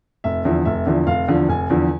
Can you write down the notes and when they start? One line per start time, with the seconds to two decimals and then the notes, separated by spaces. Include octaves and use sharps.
0.24 F1 E5
0.45 E2 D3 F3
0.65 F1 E5
0.86 E2 D3 F3
1.07 F1 F5
1.28 E2 D3 F3
1.49 F1 G#5
1.70 E2 D3 F3